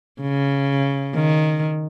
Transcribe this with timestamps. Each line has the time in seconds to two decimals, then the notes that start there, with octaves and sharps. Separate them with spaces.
0.21 C#3
1.14 D#3